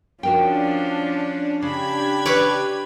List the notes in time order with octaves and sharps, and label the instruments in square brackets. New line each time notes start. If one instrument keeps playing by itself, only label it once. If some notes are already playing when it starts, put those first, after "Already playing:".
[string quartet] F3 C#4 [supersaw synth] D4 [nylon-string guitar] F#4 A#4 G5
[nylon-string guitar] C#3 [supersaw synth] D4 G4 G#6 [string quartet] B5
[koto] B4 C#5 D5